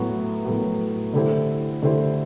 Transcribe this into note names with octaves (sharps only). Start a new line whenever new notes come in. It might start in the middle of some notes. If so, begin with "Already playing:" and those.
Already playing: A2 F#3 B3 F#4
A2 F#3 B3 F#4
D3 A3 E4 G4 C5
D3 A3 E4 G4 C5